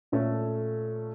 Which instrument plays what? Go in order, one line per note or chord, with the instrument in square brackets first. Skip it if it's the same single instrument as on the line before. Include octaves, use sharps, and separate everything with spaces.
[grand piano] A#2 A3 C#4 A4